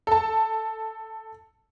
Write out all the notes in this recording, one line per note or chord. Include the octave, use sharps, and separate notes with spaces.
A4 A5